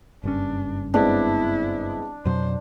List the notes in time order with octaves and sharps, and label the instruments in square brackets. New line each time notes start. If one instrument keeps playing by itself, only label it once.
[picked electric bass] F#1 G2 C#4 [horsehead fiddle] D4
[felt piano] G#3 B3 C4 [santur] D4 [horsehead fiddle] E4
[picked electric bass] F2 B2 F#3 [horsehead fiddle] C5